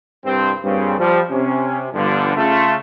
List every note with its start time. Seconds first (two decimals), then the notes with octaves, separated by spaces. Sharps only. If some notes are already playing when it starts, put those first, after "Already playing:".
0.24 C2 G2 C4
0.64 G2 A#2 C#3 C4
0.99 F3 G3
1.30 C3 C#4
1.93 G1 G2 D3 F3
2.36 C#3 A3 F4